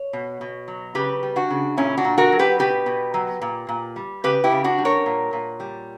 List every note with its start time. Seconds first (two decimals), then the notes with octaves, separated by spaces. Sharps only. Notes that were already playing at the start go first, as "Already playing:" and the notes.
Already playing: C#5
0.13 B2
0.41 B2
0.68 F#3
0.95 C#3 G4 B4
1.23 G3
1.36 D4 F#4
1.50 C#3
1.77 A#2 C#4 E4
1.97 D4 F#4
2.05 A#2
2.18 F#4 A#4
2.32 F#3
2.39 G4 B4
2.59 B2 G4 B4
2.86 B2
3.14 F#3
3.41 A#2
3.69 A#2
3.96 G3
4.24 C#3 G4 B4
4.44 E4 G4
4.51 C#3
4.64 D4 F#4
4.78 G3
4.85 A#4 C#5
5.06 A#2
5.33 A#2
5.60 G3